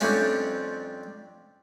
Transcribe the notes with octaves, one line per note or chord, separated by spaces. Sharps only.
F2 C3 G3 C#4 D4